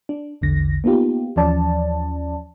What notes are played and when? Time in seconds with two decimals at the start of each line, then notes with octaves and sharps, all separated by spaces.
0.09 D4
0.41 A#1 E2 D3 A#6
0.84 A#3 B3 D#4 F4 G4
1.36 D#2 E3 F3 C#4 D5 A5